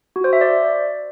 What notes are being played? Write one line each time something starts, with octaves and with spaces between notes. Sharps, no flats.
F#4
C5
E5
D5